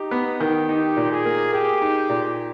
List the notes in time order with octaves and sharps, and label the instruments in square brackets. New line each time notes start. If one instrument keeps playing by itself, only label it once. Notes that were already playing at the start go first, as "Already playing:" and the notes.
Already playing: [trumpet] D#4 [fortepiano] G4
[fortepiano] B3
D#3
[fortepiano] D#4 [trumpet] G4
[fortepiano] A#2
[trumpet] G#4
[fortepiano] A#3
[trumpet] G4 [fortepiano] G#4
[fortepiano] D#4
A#2